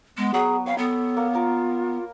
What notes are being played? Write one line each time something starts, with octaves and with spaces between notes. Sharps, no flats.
G#3 B3
F#3 G#4
C#5 F5 G5 B5
B3 A4
A#3
F4 A#4 A#5 D6